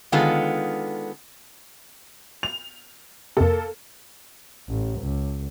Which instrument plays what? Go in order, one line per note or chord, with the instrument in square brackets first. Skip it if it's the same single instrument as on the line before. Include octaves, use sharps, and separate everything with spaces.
[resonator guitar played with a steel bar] D3 D#3 G#3 B3 F4 A4
[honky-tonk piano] F7
[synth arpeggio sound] F2 C3 [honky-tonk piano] A#3 A4
[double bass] A1
C#2